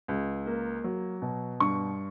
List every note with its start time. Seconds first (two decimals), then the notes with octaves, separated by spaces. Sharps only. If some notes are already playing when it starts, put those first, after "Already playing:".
0.08 C#2
0.46 A#3
0.84 F#3
1.22 B2
1.60 G2 C#6